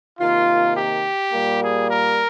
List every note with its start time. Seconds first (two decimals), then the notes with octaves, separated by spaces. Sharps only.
0.19 C3 D#3 A#3 F4
0.77 G4
1.32 A#2 G3 A#3
1.61 G#4
1.89 A#4